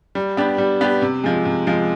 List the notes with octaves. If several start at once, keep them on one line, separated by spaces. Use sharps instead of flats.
G3
B3 D4 G4
G3
B3 D4 G4
C3
F3 G#3
C3
F3 G#3